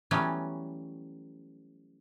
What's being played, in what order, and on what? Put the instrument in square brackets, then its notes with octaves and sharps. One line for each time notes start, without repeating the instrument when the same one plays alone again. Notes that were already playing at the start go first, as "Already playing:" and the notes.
[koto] E3 F#3 G3 A3 B3 C#4